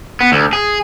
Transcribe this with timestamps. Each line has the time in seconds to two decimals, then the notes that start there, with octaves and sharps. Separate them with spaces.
0.21 B3
0.32 D2
0.53 G#4